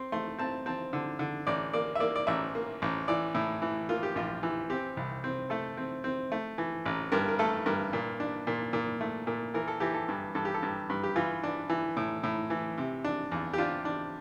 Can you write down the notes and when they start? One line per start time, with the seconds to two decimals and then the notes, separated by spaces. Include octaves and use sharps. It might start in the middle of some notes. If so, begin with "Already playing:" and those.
Already playing: C4 C6
0.12 A3 C6
0.39 C4 A5
0.66 C4 A5
0.93 D3
1.19 D3
1.47 A1 D5
1.73 A#3 D5
1.95 E5
2.00 A#3 D5
2.16 D5
2.27 A1 E5
2.55 A#3
2.82 A1
3.08 E3 D5
3.35 A2
3.62 E3
3.89 A#3 F4
4.03 G4
4.15 A#1 F4
4.43 E3
4.70 C4 G4
4.97 C2
5.24 C4
5.50 A3 A4
5.77 C4
6.04 C4
6.32 A3
6.58 E3
6.85 A1
7.12 G2 A#4
7.29 A#4
7.39 A3 A4
7.66 G2 A#4
7.93 A#2
8.20 D4
8.47 A#2
8.73 A#2
9.01 A3
9.27 A#2
9.54 E3 A#4
9.68 A4
9.80 E3 G4
9.94 A4
10.08 G2
10.35 G2 A4
10.45 G4
10.54 A4
10.63 G2
10.90 G2
11.04 G4
11.16 E3 F4
11.43 D4
11.70 E3
11.97 A2
12.24 A2
12.50 E3
12.78 C3
13.04 D4
13.32 E2
13.53 G4
13.58 D4 F4
13.85 D4